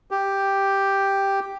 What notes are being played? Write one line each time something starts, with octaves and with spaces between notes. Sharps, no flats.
G4